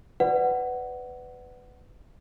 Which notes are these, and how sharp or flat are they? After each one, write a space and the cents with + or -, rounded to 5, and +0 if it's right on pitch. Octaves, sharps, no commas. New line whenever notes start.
B4 +20 D5 +0 F#5 +10